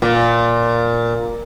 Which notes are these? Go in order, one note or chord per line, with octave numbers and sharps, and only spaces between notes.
A#2